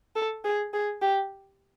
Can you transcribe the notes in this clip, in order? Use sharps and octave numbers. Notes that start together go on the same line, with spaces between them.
A4
G#4
G#4
G4